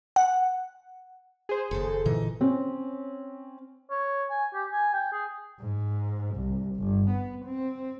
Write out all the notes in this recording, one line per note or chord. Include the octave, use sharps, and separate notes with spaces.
F#5
G#4 C5
F#1 D#2 A4
A#2 D3 E3 D#4
C4 C#4
C#5
G#5
G4
G#5
G5
G#4
G#2
C2
G1
B3
C4